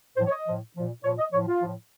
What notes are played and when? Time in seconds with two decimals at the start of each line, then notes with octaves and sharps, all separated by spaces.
0.17 A2 F3 C5
0.26 C#5
0.32 D#5
0.46 A2 F3
0.75 A#2 F3
1.04 A#2 F3 C#5
1.19 D#5
1.33 A2 F3 C#5
1.47 F4
1.62 A2 F3